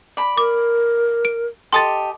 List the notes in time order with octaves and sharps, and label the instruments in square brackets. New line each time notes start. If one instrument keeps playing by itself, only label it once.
[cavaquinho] D5 B5
[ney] A#4 [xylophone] D6
[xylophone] D7
[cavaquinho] G4 A4 D#5 [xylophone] C6 D#6 A6